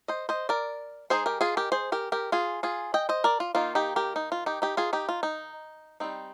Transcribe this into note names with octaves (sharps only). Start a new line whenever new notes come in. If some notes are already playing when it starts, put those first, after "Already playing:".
C5 D#5
C5 D#5
A#4 D5
G#3 D#4 G#4 C5
G4 A#4
F4 G#4
G4 A#4
G#4 C5
G4 A#4
G4 A#4
F4 G#4
F4 G#4
D#5 G5
C5 D#5
A#4 D5
F4
D#3 A#3 D#4 F4
D#4 G4
G4 A#4
D#4
F4
D#4 G4
D#4 G4
F4 G#4
D#4 G4
F4
D#4
G3 C4 D#4